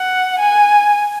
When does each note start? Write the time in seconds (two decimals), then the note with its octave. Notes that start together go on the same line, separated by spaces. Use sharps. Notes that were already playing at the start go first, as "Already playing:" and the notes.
Already playing: F#5
0.39 G#5